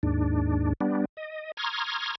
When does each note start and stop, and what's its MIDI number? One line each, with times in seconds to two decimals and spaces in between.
0.03 0.73 39
0.03 0.73 44
0.03 0.73 62
0.81 1.05 55
0.81 1.05 59
0.81 1.05 62
1.17 1.52 75
1.57 2.15 82
1.57 2.15 84
1.57 2.15 85
1.57 2.15 87
1.57 2.15 89
1.57 2.15 92